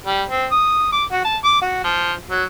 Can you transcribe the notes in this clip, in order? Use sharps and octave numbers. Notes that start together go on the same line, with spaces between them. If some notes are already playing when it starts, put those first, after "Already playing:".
G3
C4
D#6
D6
F#4
A5
D6
F#4
F3
F#3